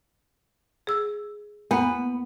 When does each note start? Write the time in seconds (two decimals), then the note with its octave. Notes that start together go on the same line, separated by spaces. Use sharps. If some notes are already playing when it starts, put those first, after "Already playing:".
0.87 G#4 E6
1.71 E2 A#3 B3